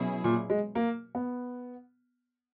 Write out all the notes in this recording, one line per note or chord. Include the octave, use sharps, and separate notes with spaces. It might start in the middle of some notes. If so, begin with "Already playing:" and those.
Already playing: B2 F#3 C#4 E4 G#4
A#2
G#3
A#3
B3